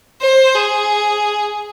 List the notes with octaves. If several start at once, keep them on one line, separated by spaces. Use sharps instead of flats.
C5
G#4